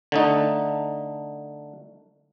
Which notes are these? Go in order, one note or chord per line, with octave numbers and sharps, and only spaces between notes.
D3 A3 D#4